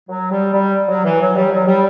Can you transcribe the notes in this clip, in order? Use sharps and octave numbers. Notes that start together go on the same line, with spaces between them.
F#3
G3
G3
F#3
E3
F#3
G3
F#3
G3